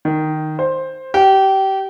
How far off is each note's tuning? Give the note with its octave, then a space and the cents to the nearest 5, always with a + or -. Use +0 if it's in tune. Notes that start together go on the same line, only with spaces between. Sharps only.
D#3 -5
C5 +10
G4 -25